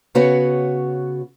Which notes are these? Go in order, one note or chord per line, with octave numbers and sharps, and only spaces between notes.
C#3 B3 F#4 B4 C#5